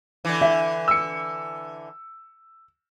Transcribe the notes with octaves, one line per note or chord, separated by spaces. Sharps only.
D3 E3
E5
E6 C#7